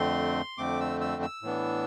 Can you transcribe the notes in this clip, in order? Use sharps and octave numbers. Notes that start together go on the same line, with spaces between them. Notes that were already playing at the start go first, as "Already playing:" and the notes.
Already playing: F2 D3 A3 C4 C6
F2 D3 A3 C4 D6
E6
E6
E6
A2 E3 B3 D4